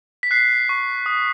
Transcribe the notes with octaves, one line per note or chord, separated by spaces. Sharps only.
B6
F#6 C7
C#6
D#6